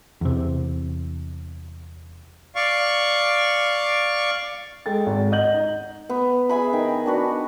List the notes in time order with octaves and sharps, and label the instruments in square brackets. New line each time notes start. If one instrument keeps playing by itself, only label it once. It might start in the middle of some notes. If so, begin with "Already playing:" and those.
[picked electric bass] E2 C3
[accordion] D5 F5 C#6
[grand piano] G#3 A4 G5 A6
G#1
D#5 F#5 G6 F#7
D#4
[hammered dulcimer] B3
G#4 E5 G#5 B5
D#3 G5
D4 F#4 B4